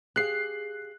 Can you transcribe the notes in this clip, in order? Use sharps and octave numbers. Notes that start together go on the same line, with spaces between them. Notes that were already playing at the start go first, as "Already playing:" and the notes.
G4 G#4 F5 F#6 C7